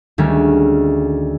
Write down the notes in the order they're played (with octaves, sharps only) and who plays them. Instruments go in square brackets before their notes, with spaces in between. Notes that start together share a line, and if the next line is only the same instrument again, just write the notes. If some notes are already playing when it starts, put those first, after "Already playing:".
[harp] D2 D#3 G3 G#3 C#4